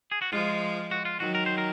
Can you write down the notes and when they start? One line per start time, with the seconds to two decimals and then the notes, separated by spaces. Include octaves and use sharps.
0.11 G#4
0.22 F#4
0.32 F3 G#3 F4
0.91 F#4
1.05 F4
1.20 D#3 F#3 F#4
1.35 A#4
1.46 C5
1.58 A#4